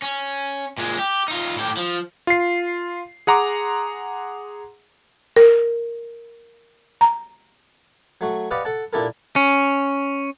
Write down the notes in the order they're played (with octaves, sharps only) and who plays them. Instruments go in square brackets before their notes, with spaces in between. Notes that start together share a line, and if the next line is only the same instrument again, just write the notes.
[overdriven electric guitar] C#4
A#2 G#3
G4
D#4 F4
A2 G4
F3
[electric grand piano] F4 C7
G#4 F#5 A#5 C6 D6
[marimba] A#4
A#5
[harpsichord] F#3 A3 F#4
G4 B4 D5 D#5 F5 F#5
A4 F#5 A5
A#2 D4 E4 G4 A4 A#4
[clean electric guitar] C#4